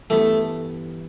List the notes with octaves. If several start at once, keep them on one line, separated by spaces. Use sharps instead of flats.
G2 E3 G3 A3 B3